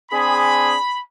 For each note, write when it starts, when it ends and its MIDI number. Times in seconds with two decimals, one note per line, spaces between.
0.10 0.75 60
0.10 0.75 62
0.10 0.75 68
0.10 1.00 83